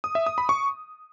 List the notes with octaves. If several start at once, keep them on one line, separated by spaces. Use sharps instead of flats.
D#6
E5
D#6
B5
C#6